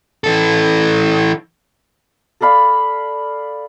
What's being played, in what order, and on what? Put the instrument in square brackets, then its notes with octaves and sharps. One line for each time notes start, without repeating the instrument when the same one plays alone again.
[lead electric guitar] E3 A4
[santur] A4 D5 F5 B5